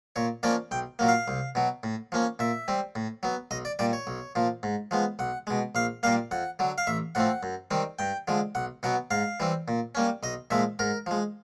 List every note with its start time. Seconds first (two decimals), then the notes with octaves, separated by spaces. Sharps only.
0.16 A#2 C#5
0.43 F3 A#3 C#4 D5
0.71 B1 G5
0.99 A#2 F#3 A#3
1.08 F5
1.28 C2
1.55 B2 F#3
1.83 A2
2.12 F3 A#3 C#4
2.39 A#2 E5
2.68 G3 C4
2.95 A2
3.23 F#3 B3
3.51 B1 D#5
3.65 D5
3.79 A#2 G3 D5
3.93 C#5
4.07 B1
4.35 A#2 F3
4.63 G#2
4.91 F3 G#3 B3
5.19 B1 F#5
5.47 B2 G#3
5.75 A#1 F5
6.03 A#2 G3 A#3 F5
6.31 F2 F#5
6.59 D3 F#3
6.78 F5
6.87 A1 E5
7.15 A2 F3 A3 C4 F#5
7.43 F#2
7.71 D#3 G3 C4
7.99 G2 G5
8.28 D3 F3 G#3
8.55 B1 F#5
8.83 B2 F#3 B3 F#5
9.11 G#2 F5
9.40 E3 G3 C4
9.68 A#2
9.95 G3 A#3 C#4
10.23 B1 D#5
10.51 A#2 F3 G#3 E5
10.79 G#2 A#4
11.06 F3 G#3